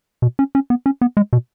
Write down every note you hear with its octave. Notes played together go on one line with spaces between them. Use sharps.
B2
C#4
C#4
B3
C#4
B3
G#3
B2